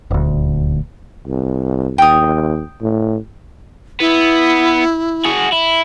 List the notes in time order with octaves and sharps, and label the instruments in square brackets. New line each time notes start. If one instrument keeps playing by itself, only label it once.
[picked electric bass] D#1 D2
[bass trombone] C2
[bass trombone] D#2 [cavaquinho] G5 D#6
[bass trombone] A2
[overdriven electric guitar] B3 [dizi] E4
[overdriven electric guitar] F#4 G#4
E4